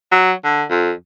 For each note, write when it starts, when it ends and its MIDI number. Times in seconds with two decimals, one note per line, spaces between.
0.12 0.31 54
0.44 0.63 50
0.70 0.91 41